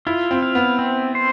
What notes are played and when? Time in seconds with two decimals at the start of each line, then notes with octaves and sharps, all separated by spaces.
0.07 E4 F4
0.31 C4
0.42 F5
0.55 B3
0.79 C4
1.15 C5